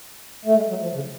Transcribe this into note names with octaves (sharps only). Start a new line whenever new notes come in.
A3
G#3
F#3
F3
C#3